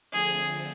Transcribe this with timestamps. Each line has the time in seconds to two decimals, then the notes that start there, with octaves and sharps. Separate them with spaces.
0.13 D3 F3 A3 C4 G#4